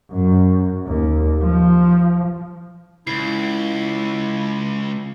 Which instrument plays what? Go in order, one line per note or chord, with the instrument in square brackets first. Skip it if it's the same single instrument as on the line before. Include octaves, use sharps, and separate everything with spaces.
[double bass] F#2
D#2
F3
[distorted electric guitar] C#2 [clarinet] E4 [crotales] C7